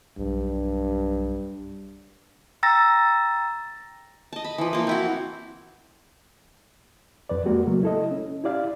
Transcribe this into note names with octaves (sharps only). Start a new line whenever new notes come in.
B1 G2
G5 A#5 E6 A6 A#6
D#5 A5
B5
E3 F3
A#3 F4
C4 E4 F#4
F2 B4 D5
G#3 A#3 F#4 G4
C#3 F#3 A3 A#3
E4 A4 D#5
C#4
E4 G4 D5 F5